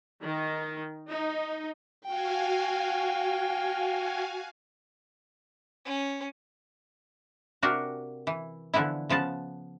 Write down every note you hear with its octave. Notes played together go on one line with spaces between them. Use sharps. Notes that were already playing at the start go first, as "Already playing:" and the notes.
D#3
D#4
F#4 F5 G5 G#5
C#4
C3 D4 F#4 G4 A#4 F5
E3
D3 E3 F3 B3 E4
C#3 F3 B3 A5